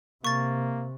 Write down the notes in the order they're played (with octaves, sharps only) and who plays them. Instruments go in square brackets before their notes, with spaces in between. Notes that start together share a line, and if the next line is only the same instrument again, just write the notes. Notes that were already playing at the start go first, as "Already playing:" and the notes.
[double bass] C3 [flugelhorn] A#3 [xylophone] C#6 A6